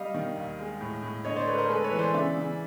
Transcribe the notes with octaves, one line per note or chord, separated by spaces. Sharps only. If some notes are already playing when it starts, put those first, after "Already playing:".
Already playing: G3 D#5 F5
D#3
D#2
G#3
A2
A2
D3 C#5 D#5
C5 D5
A3 B4 C#5
A#4 C5
G#3 A4 B4
B4 C#5
E3
C5 D5
C#3 D5 E5
C#3